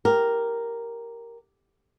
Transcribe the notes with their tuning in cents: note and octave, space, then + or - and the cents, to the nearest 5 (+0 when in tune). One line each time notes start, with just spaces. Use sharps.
G4 +0 A#4 +0